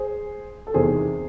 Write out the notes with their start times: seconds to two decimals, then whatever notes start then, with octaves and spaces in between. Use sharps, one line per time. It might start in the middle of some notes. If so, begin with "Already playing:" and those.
Already playing: G#4 C5
0.67 A4
0.74 E2 C3 D#3 G#4 C5